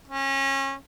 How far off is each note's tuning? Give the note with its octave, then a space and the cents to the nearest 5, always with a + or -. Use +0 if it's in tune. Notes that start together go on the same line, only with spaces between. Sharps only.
C#4 -30